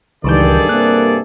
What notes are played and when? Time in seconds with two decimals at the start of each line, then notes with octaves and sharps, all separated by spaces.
0.24 C#2 G2 D#3 E3 G#4 A4 D5 G6
0.69 G2 C3 A#3 F#6